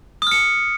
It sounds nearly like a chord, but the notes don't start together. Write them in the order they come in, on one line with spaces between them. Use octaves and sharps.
D#6 F6 C#7